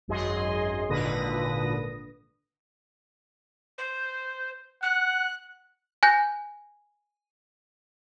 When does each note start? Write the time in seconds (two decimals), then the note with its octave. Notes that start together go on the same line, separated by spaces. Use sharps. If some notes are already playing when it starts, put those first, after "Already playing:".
0.08 G#1 F#2 G#4 D#5 C6
0.89 G#1 A#2 D3 B4 D#6 A#6
3.78 C5
4.83 F#5 F#6
6.03 G#5 F#6 G6 A#6